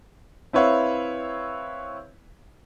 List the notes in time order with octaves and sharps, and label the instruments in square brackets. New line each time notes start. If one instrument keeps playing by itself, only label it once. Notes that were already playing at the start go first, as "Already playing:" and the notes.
[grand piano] C4 E4 B4 C#5 E5 F5